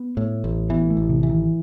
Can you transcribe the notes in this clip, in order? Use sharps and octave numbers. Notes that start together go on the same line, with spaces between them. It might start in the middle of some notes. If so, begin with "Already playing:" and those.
Already playing: B3
A2
A1
E3 B3
A3
A1
C3
E3
D#3